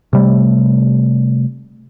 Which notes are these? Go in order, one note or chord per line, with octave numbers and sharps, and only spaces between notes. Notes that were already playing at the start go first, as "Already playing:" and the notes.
C3 G3 A3